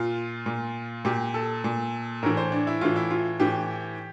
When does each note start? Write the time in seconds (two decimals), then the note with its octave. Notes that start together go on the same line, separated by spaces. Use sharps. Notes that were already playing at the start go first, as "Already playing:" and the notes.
Already playing: A#2 F4
0.46 A#2
1.05 A#2 G4
1.34 A4
1.64 A#2
2.23 A2 E3 A#4
2.37 C5
2.52 D4
2.67 E4
2.81 A2 E3 F4
2.96 E4
3.10 F4
3.40 A2 E3 G4